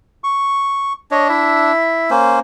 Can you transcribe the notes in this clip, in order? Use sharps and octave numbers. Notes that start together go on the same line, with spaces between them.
C#6
D4 C#5 D#5
E4 E5
A#3 C#4 C5